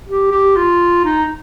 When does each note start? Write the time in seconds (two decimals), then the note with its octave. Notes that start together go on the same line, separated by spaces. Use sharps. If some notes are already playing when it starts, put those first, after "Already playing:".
0.07 G4
0.31 G4
0.56 F4
1.05 D#4